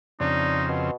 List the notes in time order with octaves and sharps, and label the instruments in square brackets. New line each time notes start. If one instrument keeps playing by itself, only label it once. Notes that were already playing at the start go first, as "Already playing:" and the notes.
[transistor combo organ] F2 C#3 C4 [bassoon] D4 [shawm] D#4
[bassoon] B2